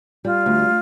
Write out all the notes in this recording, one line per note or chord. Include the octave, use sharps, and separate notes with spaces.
G3 F4
D2